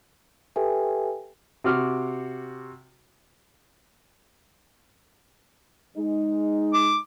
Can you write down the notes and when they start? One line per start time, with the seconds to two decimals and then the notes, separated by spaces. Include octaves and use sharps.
0.56 G4 A4 B4 E5 G5 G#5
1.64 C3 F#4 D6 F6
5.96 G#3 D#4
6.74 D6